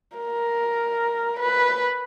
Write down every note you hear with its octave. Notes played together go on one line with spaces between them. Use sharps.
A#4
B4